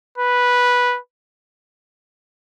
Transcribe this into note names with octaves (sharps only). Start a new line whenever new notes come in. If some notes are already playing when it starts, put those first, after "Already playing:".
B4